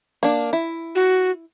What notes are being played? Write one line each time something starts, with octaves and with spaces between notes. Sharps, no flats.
A#3 D4
E4
F#4